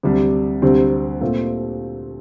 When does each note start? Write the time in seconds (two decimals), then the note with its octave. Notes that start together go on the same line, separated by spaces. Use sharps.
0.03 D2 C3 G3 D4
0.62 D2 C3 G3 C4
1.21 A#2 A3 C4 F4